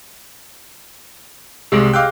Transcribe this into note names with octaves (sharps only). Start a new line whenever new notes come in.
C2 G#3 G4 G#4 E6
D#5 F5 G5 D6 E6 F#6